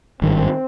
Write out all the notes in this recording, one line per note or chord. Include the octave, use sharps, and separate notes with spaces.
G#1 G2 D#3 C4